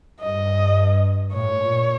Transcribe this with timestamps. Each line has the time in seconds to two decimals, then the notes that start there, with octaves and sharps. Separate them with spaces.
0.20 G2 D#5
1.33 A2 C#5
1.62 A#2